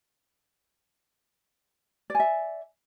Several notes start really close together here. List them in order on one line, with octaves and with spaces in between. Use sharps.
D5 G#5 E5